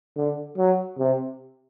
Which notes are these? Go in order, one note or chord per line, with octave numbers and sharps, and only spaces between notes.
D3
F#3
C3